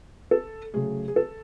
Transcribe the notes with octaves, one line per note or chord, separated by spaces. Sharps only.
A4
C#3 F#3 A3 G#4
G#4
A4